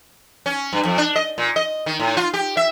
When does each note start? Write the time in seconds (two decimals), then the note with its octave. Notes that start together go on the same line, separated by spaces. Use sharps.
0.46 C#4
0.73 G2
0.85 F2
0.98 D4
1.16 D#5
1.38 A#2
1.56 D#5
1.86 D#3
1.99 A2
2.17 F4
2.34 G4
2.57 E5